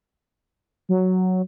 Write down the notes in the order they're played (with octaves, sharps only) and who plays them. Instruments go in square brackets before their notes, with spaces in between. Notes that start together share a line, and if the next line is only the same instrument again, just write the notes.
[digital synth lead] F#3